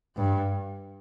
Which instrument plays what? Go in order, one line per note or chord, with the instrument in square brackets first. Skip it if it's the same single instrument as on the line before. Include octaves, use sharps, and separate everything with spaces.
[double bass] G2